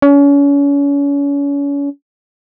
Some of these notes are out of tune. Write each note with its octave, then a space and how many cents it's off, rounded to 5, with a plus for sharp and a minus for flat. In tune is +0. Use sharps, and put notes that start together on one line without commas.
C#4 +35